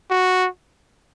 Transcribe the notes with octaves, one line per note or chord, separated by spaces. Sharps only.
F#4